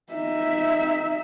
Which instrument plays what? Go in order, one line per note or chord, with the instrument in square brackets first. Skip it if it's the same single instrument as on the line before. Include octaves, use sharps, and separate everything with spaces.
[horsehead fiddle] D#4 E5